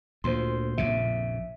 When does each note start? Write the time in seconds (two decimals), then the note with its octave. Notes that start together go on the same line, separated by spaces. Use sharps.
0.24 D2 A#2 C5 C6
0.78 A#1 F2 C#3 E5